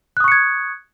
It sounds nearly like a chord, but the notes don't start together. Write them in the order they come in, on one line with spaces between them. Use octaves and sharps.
F#6 D#6 C#6 C#7 G#6